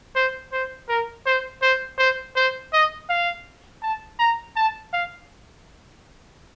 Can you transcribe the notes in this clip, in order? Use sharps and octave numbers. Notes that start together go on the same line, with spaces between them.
C5
C5
A#4
C5
C5
C5
C5
D#5
F5
A5
A#5
A5
F5